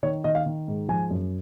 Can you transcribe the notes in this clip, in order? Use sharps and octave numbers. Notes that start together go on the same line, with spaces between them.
D#3 C#5
D#3 D#5
F5
D#3
G#2
F3 G#5
F#2